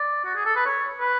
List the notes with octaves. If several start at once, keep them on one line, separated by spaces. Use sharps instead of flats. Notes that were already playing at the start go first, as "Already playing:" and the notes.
Already playing: D5
F#4
G#4
A4
B4
C#5
B4